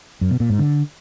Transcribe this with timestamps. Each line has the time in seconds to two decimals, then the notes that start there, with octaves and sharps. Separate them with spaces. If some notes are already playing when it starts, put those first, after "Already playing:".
0.21 F#2
0.31 B2
0.40 A#2
0.50 G#2
0.59 D3